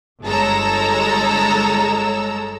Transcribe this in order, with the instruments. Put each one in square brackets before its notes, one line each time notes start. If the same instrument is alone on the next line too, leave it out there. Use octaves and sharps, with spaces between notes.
[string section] G1 G#3 A4 C#5 A#5 E6